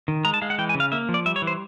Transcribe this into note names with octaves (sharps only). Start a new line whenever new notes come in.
D#3
G#3 A#5
A5
G#3 F5
F#5
E3 G5
G#5
C#3
F5
A#3 E5
F3
D5
G3 E5
C#5
E3
C5